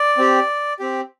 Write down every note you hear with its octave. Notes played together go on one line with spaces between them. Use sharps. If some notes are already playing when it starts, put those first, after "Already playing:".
Already playing: D5
C4 G4
C4 G4